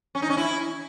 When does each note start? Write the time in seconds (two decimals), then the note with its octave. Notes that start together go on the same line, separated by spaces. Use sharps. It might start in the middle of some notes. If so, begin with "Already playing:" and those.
0.15 C#4
0.22 D#4
0.30 C#4
0.37 E4